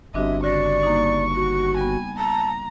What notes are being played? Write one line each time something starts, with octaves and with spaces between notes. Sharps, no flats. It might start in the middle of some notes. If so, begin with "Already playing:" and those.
G1 C4 D4 F#4 D#5 E5
C#3 F#4 D5 C#6 A#6
A#3 D#4
F#4
G3 B3 G#5
A5 A#5